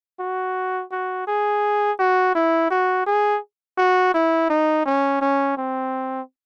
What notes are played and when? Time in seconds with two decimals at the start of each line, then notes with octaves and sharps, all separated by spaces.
0.20 F#4
0.92 F#4
1.27 G#4
1.99 F#4
2.35 E4
2.70 F#4
3.06 G#4
3.78 F#4
4.14 E4
4.50 D#4
4.86 C#4
5.21 C#4
5.57 C4